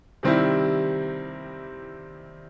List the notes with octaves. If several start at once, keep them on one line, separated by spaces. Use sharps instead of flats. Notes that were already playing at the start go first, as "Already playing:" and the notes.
C3 D#3 G3 C4 E4